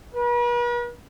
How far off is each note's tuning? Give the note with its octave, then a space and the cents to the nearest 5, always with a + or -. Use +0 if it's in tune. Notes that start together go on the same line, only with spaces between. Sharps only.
B4 -45